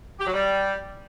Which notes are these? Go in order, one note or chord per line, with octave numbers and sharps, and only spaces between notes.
G4
F#3
G3